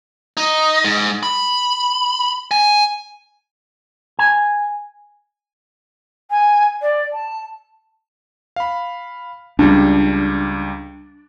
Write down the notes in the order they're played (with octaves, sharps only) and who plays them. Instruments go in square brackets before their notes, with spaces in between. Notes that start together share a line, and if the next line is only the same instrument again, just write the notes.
[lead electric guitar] D#4
G#2
B5
G#5
[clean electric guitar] G#5
[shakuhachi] G#5
D5
A5
[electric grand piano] F5 B5
[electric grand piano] C#2 G3 [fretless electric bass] D4